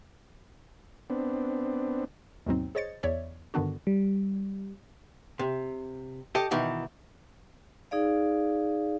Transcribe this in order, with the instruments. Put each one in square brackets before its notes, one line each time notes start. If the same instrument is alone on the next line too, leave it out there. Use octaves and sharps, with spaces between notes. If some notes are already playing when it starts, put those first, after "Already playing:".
[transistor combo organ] B3 C4 D4
[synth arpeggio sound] D#2 G#2 B2 F#3 C4 D#4
G#4 C5 C#5 D#5 A6 C#7
E2 C#5 D5 E5
G2 D3 D#3 B3 D4 F#4
[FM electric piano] G3
[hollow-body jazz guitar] C3
G4 A4 D#5
B2 D#3 E3 D#4
[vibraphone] D#4 G#4 D5 F5